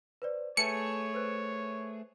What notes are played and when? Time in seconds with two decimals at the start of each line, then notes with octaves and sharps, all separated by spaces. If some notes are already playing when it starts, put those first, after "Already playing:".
0.22 B4 C5 D5
0.57 A3 G#4 B4 C#5 E5 A5 C#7
1.14 B4 C5 F#6